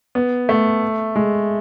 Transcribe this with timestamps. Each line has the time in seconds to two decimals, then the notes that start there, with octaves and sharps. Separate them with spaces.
0.15 B3
0.49 A3
1.16 G#3